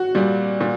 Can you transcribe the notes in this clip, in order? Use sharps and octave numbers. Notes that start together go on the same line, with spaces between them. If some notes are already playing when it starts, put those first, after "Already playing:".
Already playing: F#4
A#2 G3
A#2